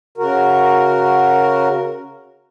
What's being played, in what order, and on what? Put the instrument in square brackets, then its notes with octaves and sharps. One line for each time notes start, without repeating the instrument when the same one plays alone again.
[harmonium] C#3 F#4 A#4